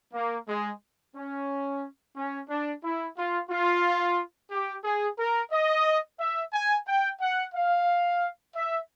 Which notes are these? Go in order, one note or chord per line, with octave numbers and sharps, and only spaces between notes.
A#3
G#3
C#4
C#4
D4
E4
F4
F4
G4
G#4
A#4
D#5
E5
G#5
G5
F#5
F5
E5